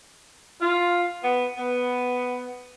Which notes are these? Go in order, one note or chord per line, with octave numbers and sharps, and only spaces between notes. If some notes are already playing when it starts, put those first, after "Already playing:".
F4
B3
B3